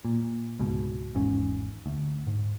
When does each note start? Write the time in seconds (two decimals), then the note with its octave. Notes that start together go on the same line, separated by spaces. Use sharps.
0.05 A#2
0.59 C#2 G#2 B2
1.15 G#1 E2 G#2 C#4
1.86 D2
2.27 G#2